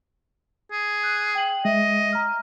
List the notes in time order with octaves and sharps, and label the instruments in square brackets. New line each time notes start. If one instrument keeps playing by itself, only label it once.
[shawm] G#4
[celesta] F#6 G6
G5 F#7
[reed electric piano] G#3 [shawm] D#5 [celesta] E5
[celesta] A#5 F6